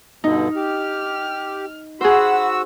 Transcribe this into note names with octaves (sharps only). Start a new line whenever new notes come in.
G2 B2 D3 D#4
G4 F6
F#4 G#4 C5 F#5 B5 E6